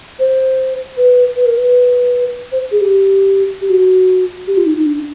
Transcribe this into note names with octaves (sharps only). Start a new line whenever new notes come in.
C5
B4
B4
A#4
B4
C5
G#4
G4
G4
F#4
G4
F4
D#4
D#4
D4